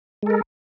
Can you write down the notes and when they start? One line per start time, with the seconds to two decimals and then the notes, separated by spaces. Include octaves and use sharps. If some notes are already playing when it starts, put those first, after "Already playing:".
0.23 G#3
0.26 A4
0.30 A#4